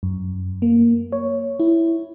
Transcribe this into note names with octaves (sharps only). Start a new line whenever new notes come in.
F#2
A#3
C#5
E4